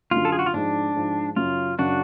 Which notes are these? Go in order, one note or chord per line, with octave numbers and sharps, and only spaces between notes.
F#2 D3 F#3 F4
A4
G#4
F#4
F4
G#2 F3 G#3 D4
G#2 F3 G#3
F#2 C#3 F#3 C#4 F4
F#2 C#3 F#3 C#4 D4 F#4